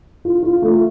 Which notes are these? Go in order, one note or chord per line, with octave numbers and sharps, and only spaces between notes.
F4
F4
A3